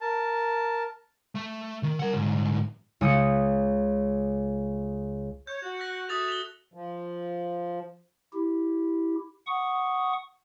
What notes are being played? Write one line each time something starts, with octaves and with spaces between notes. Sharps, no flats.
A#4 A5
A3
D#3
A#4 F#5
D2 G#2
C#2 D#6 C#7
C#5 G6
F#4
F#6 A#6
F#4 A4 E5 D#6 A6 F7
F7 G7
F3
E4 G4
F#5 C#6 D#6